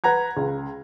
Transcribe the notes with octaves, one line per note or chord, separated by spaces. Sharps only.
B4 F#5 A#5 G#6
C#2